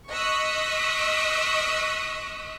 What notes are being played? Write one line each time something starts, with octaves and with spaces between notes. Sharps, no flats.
D#5 C#6 D#6 E6 F#6 B6